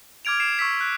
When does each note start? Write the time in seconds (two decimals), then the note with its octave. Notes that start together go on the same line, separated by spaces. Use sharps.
0.25 D6 F6 G#6 D7 F7
0.40 C7 D7 E7
0.59 C#6 E6 B6
0.81 F#6